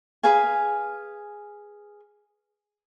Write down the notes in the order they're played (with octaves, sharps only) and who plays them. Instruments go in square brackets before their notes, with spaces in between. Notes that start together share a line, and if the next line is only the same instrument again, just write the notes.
[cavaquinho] G#4 B4 F5 G#5